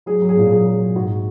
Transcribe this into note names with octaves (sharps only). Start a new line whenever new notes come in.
F#3 G#4
F#3
G#4
A#2
F#3 G#4
F#3
F#3
G#2 F#4